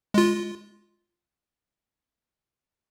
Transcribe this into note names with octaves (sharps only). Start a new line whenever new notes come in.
G#3 F4